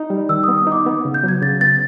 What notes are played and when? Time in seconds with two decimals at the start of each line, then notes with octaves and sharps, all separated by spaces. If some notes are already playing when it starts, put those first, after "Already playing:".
Already playing: D#4
0.10 G3
0.29 D#3 E6
0.44 D#6
0.48 B3
0.58 D#6
0.67 D#4 D6
0.87 B3
1.05 C#3
1.14 G6
1.23 F#3 G#6
1.42 C#3 A6
1.61 B3 A6